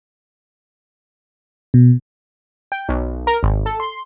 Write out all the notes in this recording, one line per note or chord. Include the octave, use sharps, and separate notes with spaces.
B2
G5
B1
A#4
G#1
A4
C6